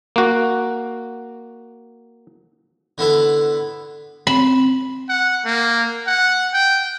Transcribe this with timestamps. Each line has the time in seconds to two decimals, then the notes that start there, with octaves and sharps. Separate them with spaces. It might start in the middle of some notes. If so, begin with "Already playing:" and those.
0.16 A#3 F#4
2.98 D3 B3 E4 A4
4.27 C4 B5
5.09 F#5
5.45 A#3
6.07 F#5
6.53 G5